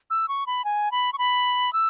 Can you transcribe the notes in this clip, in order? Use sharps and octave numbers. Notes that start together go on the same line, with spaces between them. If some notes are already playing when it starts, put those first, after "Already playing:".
E6
C#6
B5
G#5
B5
C#6
B5
E6